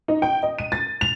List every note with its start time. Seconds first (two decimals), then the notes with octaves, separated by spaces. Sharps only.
0.08 D#4
0.22 G5
0.43 D#5
0.59 D#7
0.72 A6
1.01 F7